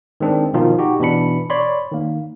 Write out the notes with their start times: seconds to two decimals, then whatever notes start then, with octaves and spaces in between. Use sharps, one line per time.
0.20 D#3 G#3 C4 D4
0.54 B2 D#3 F3 D#4 F4
0.79 D#4 F#4 G4
1.00 B2 E3 D4 B5 C#7
1.50 C#5 D5 B5 C6
1.91 D#3 A#3